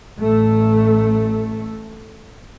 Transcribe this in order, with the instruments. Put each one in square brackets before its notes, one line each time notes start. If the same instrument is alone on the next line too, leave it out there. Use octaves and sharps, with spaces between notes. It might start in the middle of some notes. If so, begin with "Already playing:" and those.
[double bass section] A1 A3